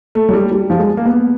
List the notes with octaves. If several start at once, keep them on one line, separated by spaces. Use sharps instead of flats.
A3
F#3
G3
G3
F3
G#3
A#3
B3